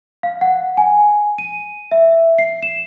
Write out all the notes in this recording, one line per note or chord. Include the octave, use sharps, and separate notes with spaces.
F5
F#5
G#5
D#7
E5
C7
E7